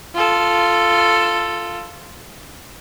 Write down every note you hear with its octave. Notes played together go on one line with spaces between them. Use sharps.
F4 A4